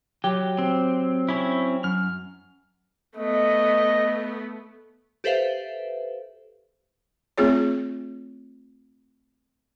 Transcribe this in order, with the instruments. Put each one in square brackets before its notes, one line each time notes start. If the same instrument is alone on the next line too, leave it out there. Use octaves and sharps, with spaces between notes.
[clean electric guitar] F#3 G4
[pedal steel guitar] C4
C4 C#4 E4
[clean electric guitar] F#2 [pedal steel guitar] F6
[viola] A3 B3 [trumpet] D#5
[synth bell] G4 A4 B4 C5 E5 F5
[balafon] A3 C4 F4 G#4 C#5